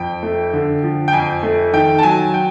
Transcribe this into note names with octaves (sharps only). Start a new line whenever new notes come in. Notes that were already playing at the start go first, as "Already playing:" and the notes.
Already playing: F2 G5
A3
D3
F3
G5
F2 G#5
A3
D#3 G5
A5
F#3 G#5
G5